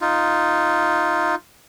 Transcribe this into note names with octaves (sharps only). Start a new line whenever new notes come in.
D#4 F4